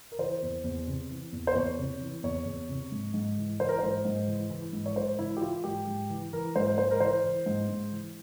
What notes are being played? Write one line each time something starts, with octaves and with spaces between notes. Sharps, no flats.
A#4
E3 C5
E2
E2
C3
E3
E2
C5
E2 C#5
C3
E3
E2 C#5
E2
C3
G#2
G#2
E3
E3 C5
A#4
G#2 C5
G#2
E3
E3
G#2
C#5
G#2 C5
E3 E4
G4
E3 F4
G#2 G4
G#2
E3
E3 A#4
G#2 C5
G#2 C5
A#4
E3 C5
E3
G#2
G#2
E3